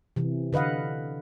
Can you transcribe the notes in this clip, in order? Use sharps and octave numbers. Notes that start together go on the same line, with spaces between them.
C3 E3
D3 B4 D#5 F5 F#5